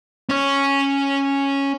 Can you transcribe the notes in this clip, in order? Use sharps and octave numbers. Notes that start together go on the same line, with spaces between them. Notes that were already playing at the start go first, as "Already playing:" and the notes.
C#4 C#5